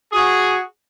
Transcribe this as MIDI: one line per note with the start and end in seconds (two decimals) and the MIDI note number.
0.12 0.58 66
0.12 0.58 68